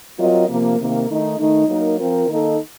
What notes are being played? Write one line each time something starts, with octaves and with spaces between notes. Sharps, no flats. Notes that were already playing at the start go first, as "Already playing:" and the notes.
F#3 C4 F4 A#4 D#5
C3 F3 A#3
C3 D#3 A#3
D#3 A3 D#4
D#3 A3 D#4
F#3 A#3 D#4 A#4
F3 C4 F4 A#4
D#3 A#3 D#4 A4